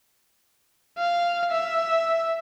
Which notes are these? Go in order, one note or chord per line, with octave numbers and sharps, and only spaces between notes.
F5
E5